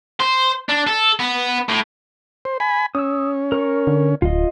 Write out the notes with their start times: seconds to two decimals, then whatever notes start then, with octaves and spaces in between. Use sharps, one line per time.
0.20 C5
0.69 D4
0.87 A4
1.20 B3
1.69 A2
2.45 C5
2.60 G#5 B5
2.95 C#4 D#6 E6
3.52 A#4 C#6
3.87 D3
4.22 D1 F4 D#5